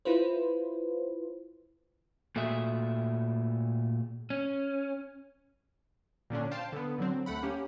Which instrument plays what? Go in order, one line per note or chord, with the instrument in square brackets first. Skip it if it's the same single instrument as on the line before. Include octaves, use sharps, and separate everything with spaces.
[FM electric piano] E4 F4 B4 C5
[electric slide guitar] A#2 A3 F#4 G#4 E5
C#4
[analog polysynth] A#2 D3 C#4 D4
C5 F5 G5 A5
D3 B3
D3 F#3 C4
D2 A3 F#5 B5
A#3 C#4 G4